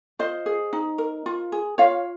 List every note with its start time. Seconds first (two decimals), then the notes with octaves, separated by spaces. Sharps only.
0.19 F4 C5 D#5
0.46 G#4
0.73 D#4
0.98 A#4
1.26 F4
1.52 G#4
1.78 F4 C#5 F5